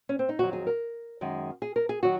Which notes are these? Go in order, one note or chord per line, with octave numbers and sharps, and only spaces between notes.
C#4
C4
D#4
F2 D#3 F#3 F#4
G#4
A#4
F#2 D#3 G#3
G#4
A#4
G#4
D#3 F#3 F#4